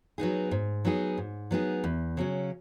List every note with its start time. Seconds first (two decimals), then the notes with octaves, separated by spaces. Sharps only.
0.18 F#3 B3 D#4 G#4
0.51 G#2
0.85 F#3 B3 D#4 G#4
1.17 G#2
1.51 F#3 B3 D#4 G#4
1.84 E2
2.17 C#3 F#3 C#4